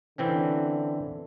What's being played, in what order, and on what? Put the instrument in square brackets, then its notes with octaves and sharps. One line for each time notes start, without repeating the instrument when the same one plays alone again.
[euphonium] D3 [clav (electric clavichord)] E3 C4 C#4